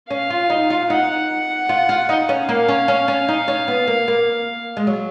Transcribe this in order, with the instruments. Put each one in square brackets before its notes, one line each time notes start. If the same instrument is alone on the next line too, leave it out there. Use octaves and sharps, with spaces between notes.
[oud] C#4 [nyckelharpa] F5
[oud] F4
D#4
F4
[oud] D#4 [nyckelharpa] F#5
[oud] F4
F4
D#4
C#4
[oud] A#3 [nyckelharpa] F5
[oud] C#4
C#4
C#4
D#4
C#4
B3
A#3
A#3
G#3
F#3